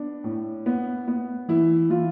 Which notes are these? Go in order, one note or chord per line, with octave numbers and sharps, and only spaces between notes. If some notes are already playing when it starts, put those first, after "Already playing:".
Already playing: B3 D4
A2
B3
B3
E3 E4
E3 F4